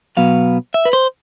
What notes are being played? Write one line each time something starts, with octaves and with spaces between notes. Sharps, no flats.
B2 F#3 B3 F5
E5
B4
C5